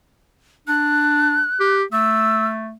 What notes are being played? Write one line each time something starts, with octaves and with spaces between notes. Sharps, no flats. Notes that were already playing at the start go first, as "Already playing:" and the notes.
D4 F#6
G4
A3 E6